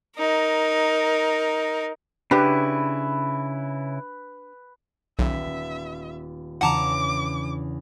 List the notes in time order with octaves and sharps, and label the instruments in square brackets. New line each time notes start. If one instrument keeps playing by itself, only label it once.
[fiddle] D#4 A#4
[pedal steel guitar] C#3 E4 [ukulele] D4 G4 [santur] B4
[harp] D#1 B3 B6 [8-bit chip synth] B1 [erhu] E5
[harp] E2 C#3 D4 [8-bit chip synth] F#5 A5 A#5 [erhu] D6